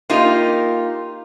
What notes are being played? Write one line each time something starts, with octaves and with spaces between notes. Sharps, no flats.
A#3 D#4 F4 G4